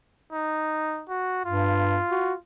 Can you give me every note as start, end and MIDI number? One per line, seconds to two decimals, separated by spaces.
0.33 1.04 63
1.09 1.43 66
1.46 1.99 43
1.46 2.38 65
2.11 2.33 66